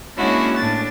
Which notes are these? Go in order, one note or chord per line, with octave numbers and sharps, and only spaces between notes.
G#3 A#3 C#4 D4 E4 F#4
A2 D4 A6